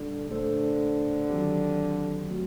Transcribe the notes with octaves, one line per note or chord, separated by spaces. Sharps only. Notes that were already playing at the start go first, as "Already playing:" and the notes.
Already playing: A#2 D3 G3 A#3 D4 G4
A#2 D3 A3 D4 A4 C5
D#3 F#3 C4 G4
F#3 A3 C4 F#4